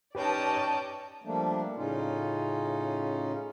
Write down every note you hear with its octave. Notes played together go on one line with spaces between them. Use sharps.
C#4 D#4 G4 B4 C#5 D5 G5 A5
F3 G3 A3 A#3 D4
A2 C#3 C#4 D#4 F4